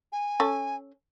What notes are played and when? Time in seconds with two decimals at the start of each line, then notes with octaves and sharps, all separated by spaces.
0.12 G#5
0.40 C#4 A4